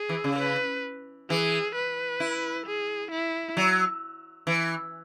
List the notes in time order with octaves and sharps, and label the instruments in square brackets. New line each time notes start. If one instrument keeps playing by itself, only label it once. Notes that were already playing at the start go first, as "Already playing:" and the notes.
Already playing: [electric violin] G#4
[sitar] E3
C#3
[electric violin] B4
[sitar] E3 [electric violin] G#4
[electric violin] B4
[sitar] E4
[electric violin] G#4
E4
[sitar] F#3
E3